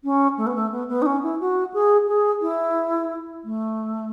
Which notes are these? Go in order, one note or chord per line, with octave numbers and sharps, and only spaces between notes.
C#4
A3
B3
A3
B3
B3
D#4
C#4
E4
F#4
G#4
G#4
E4
A3